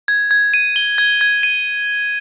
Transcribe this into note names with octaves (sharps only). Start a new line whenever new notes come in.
G#6
G#6
D#7
G7
G#6
G#6
D#7